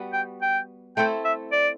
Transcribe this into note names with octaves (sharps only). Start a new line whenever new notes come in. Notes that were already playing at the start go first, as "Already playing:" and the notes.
Already playing: G3 B3 F#4
G5
G5
A3 C4 E4 A4 G5
E5
D5